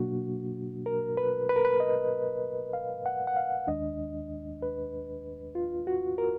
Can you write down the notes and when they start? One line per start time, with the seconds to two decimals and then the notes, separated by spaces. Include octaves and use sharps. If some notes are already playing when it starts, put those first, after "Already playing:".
Already playing: B2 F#3 A#3 D4 F#4
0.86 A#4
1.17 B4
1.49 B4
1.56 A#4
1.65 B4
1.80 D#5
2.73 F5
3.06 F#5
3.27 F#5
3.37 F5
3.67 D#2 D#3 G#3 D4 D#5
4.62 B4
5.55 F4
5.87 F#4
6.18 A#4